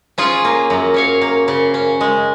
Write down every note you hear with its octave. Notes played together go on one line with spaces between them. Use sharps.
C#4 F4 G#4
A#3
F#2
C#4 C#5 F5
A#3
C#3
C#4
G#3